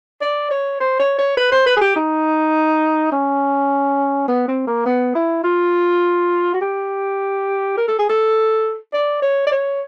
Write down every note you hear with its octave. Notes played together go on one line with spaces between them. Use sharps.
D5
C#5
C5
C#5
C#5
B4
C5
B4
G#4
G4
D#4
C#4
B3
C4
A#3
B3
E4
F4
F#4
G4
A#4
A4
G#4
A4
D5
C#5
D5
C#5